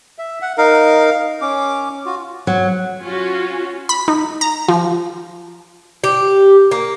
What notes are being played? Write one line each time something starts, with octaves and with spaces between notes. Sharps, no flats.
E5
F#5
D#4 A#4 F5
C#4 D6
F4 F#4
F#3
C#4 F4 F#4
B5
D#4
A#5
F3
G4
A#3